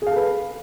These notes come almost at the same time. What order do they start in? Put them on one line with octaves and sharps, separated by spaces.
G#4 F5 A4 B4